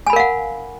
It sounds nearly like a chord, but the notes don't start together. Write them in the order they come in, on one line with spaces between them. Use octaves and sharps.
G#5 B5 A#4 F5 F#5